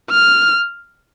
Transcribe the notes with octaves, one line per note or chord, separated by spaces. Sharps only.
F6